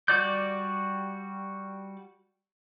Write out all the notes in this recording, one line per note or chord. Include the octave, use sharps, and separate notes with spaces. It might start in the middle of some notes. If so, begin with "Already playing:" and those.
G3 F#4 D5 D6 G6